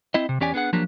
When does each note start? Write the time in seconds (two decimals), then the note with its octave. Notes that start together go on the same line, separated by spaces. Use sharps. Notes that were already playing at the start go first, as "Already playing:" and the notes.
0.14 C4 E4 D#5
0.29 C3
0.41 E2 C#4 G4 D5 G#5
0.54 B3 D4 G#4 F#5
0.73 F3 F#3 A#3 D4 G4